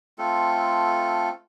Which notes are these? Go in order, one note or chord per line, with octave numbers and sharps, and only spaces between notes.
A3 C4 F4 A4